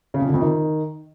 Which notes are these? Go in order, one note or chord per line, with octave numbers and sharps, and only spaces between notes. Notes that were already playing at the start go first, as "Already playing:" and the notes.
C#3
F2
D3
F2
D#3